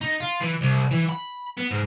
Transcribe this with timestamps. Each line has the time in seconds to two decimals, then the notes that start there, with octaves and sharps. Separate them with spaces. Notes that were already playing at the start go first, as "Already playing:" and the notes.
0.01 D#4
0.20 F4
0.40 E3
0.61 C2
0.91 E3
1.09 B5
1.57 B3
1.71 G#2